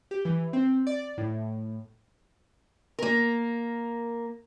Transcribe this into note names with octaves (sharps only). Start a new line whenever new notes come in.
G4
E3
C4
D5
A2
A#3 A#4